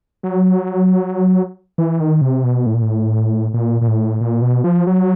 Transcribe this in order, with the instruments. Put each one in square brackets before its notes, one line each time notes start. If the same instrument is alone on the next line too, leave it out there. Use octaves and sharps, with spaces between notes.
[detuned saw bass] F#3
E3
D#3
C3
B2
A2
A#2
A2
A#2
A#2
A2
A#2
B2
F3
F#3